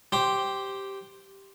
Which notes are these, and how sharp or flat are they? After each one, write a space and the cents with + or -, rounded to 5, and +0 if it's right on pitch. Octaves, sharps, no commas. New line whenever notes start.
G4 -5 C5 +0